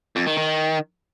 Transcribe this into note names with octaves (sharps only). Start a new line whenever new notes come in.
F2
D#3
D#3